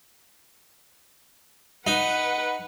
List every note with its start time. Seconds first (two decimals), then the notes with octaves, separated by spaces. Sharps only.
1.87 D#4 B4 F#5